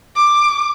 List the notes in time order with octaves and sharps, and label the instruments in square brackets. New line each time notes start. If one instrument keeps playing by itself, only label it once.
[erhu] D6